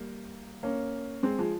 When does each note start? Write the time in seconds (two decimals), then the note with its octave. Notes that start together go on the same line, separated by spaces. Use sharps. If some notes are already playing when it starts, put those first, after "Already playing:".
Already playing: G3 A#3
0.63 A#3 C#4
1.23 G#3 C4
1.39 F3 G#3